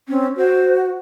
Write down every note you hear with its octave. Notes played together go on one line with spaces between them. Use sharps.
C4 C#4
F#4 C5